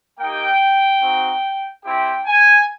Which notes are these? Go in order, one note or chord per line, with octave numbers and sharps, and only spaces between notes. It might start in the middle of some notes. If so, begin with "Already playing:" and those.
A#3 D#4 G4 G5
C4 D#4 F#4
C4 E4 G4 G5
G#5